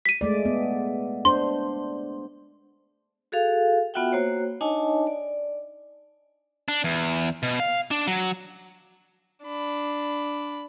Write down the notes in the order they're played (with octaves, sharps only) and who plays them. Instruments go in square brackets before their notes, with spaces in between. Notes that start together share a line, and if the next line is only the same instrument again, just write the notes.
[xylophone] B6 D#7
[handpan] G#3 A3 D5
B3
[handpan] D4 C5 [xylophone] C6
[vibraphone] F#4 G#4 A4 F5
B3 F4 F#4 E5 F#5 G5
A#3 F#4 C5 C#5
D4 D#4 C#5 D#5 G#5 A5
D5
[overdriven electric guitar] D4
E2
B2
F5
D4
F#3
[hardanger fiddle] D4 B5